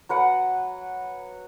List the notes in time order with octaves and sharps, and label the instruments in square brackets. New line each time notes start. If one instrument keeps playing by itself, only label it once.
[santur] F#3 B4 F#5